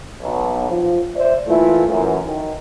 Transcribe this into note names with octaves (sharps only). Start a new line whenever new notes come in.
B1
F3
C5 D5 E5
E3 A3 A#3 E4 F4
F#2 E3
D#3